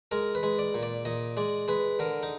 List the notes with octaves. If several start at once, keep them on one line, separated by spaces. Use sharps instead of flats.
G#3 A#4
B4
G#3
D5
A#2
D5
A#2 D#5
G#3 D5
G#3 B4
D3 A#4
D#4